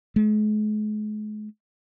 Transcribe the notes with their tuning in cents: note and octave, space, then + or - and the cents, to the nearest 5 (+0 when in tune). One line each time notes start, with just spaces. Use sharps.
G#3 +40